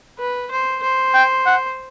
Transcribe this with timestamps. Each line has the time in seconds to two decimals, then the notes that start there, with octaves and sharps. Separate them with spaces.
0.19 B4
0.51 C5
0.83 C5
1.14 G5
1.46 F#5